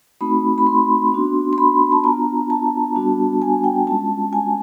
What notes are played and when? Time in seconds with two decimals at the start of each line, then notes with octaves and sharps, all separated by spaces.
0.21 A3 C4 D#4 F#4 B5
0.58 B5
0.66 C6
1.12 B3 D4 F#4
1.53 C6
1.58 B5
1.92 A5
2.04 B3 D4 F4 A#5
2.50 A5
2.95 G3 B3 D4 F#4
3.42 G#5
3.64 G5
3.87 G#3 C#4 F4 A5
4.33 G#5